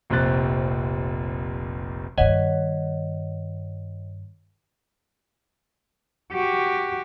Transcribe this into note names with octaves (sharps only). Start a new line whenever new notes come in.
F1 A#1 C3 C4 F#6 A6
G2 D#3 C#5 D#5 F#5
F#4 G4